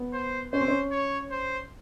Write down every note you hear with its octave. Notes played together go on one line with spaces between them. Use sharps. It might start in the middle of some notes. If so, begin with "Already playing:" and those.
Already playing: B3
C5
C#4 C5
C4
C#4
C#5
C5